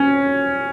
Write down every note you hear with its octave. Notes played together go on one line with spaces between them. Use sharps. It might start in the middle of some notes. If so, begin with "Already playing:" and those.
Already playing: C#4